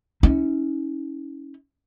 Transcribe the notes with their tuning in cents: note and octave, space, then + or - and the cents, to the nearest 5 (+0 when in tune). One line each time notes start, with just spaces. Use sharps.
C#4 +0 E4 -45